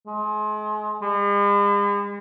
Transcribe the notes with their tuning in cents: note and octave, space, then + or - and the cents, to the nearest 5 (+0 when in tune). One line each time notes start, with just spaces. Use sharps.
G#3 +35
G#3 -45